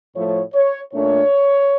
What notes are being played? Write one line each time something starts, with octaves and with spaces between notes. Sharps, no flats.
A2 F3 A3 C#5
C#5
A#2 A3 D4 C#5